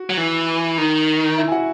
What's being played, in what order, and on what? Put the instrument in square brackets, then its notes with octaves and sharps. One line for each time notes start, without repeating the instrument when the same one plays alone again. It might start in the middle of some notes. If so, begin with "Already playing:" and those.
Already playing: [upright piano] F#4
[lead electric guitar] F#3
E3
D#3
[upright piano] E4 E5
G#5
F#4 F#5